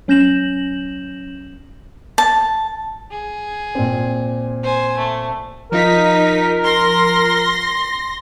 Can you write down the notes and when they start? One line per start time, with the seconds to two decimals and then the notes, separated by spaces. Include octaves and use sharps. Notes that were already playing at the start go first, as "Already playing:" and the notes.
0.08 F#3 C#4 G6 A#6 E7 F#7
2.18 A5
3.11 G#4
3.75 A#2 C4
4.63 C5 G#5
4.98 A3
5.72 F3 D#4 F4 A#4 B6
6.65 C6 A#6